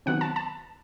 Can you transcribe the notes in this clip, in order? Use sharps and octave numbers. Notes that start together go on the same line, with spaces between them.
C3 D#3 F#3 B3 F#5
A5
A5